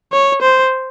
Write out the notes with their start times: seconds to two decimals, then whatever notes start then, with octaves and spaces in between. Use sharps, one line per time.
0.13 C#5
0.42 C5